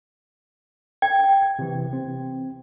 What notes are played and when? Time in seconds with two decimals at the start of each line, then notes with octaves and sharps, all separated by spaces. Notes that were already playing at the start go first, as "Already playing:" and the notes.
1.02 G5 G#6
1.59 C3 E3
1.93 C4